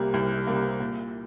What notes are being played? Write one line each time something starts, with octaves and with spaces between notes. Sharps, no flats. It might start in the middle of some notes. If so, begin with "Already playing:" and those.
Already playing: C2 C3 G3 A#3
C2
C3 G3 A#3
A#2